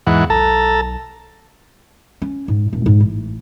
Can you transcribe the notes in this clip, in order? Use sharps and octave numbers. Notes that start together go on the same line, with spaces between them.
E2 G#2 E3 F#5
B1 A4 A5 A#5
C#4
G#2
D#1
G#2
A1